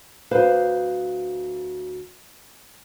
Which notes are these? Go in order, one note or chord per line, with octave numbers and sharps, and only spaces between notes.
D2 B4 C5 F5